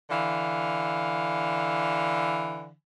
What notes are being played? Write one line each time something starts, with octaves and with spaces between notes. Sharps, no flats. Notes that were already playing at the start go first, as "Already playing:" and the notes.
D3 E3 F5